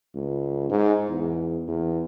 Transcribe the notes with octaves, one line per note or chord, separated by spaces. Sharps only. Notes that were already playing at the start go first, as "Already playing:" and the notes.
C#2
G#2
E2
E2